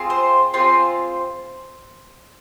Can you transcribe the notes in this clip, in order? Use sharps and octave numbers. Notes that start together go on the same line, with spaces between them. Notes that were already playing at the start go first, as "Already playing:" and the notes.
Already playing: C4 F4 G#4
C5
C4 F4 G#4 C5